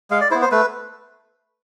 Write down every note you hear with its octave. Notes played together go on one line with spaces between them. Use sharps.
G#3 F5
D5
B3 E4 C5
C5
A3 B4